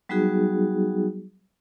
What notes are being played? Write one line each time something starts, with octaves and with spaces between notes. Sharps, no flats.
F#3 G3 B3 D#4 F#4 G#4